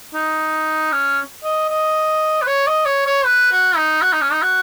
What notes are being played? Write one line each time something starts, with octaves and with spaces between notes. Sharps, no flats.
D#4
C#4
D#5
D#5
B4
C#5
D#5
C#5
C#5
B4
F#4
D#4
F#4
D#4
C#4
D#4
F#4